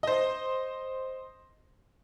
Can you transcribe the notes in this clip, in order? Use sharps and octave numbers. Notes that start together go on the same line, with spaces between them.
C5 D#5